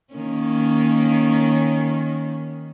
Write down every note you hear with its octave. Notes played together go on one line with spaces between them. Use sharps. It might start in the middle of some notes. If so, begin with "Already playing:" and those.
D#3 A#3 C#4